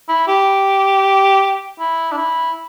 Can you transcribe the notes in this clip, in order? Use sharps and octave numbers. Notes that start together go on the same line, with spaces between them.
E4
G4
E4
D4
E4